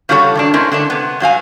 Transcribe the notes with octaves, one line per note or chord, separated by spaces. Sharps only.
C#3 G3 F4 F#4 A4 C#5
G2 D#3 D4
G#3 C4 C#4 E4 A#4
D3 A3 D4
C3 B3
G2 F#3 F5 G#5